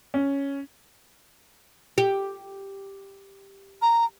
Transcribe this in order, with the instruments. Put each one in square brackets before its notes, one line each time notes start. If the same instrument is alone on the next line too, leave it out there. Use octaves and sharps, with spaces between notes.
[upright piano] C#4
[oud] G4
[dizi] A#5